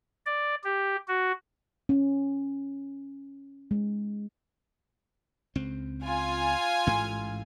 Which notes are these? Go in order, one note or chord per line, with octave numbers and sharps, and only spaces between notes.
D5
G4
F#4
C#4
G#3
C#2 C4
F4 G#5
A1 G#2 A3